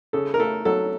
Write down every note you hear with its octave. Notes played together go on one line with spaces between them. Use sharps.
C#3 A4
A#4
A3 A4
F#3 A4